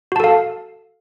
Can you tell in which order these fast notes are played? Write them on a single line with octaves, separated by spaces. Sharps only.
F#4 A5 A4 F5